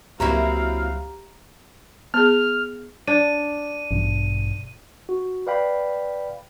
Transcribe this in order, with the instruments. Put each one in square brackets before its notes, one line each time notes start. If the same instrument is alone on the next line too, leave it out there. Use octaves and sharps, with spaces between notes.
[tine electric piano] C#2 [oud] F#3 A#3 E4 [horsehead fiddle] C4 F5 [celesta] G4 A#5
[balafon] B3 G#4 [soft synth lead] F6
[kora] D4 [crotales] D#7
[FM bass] A1 [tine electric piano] G2 B2
[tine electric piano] F#4
B4 D5 F5 G5 B5